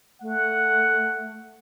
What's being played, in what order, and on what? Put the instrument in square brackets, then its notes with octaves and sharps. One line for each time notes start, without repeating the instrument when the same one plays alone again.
[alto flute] A3 [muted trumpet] F#5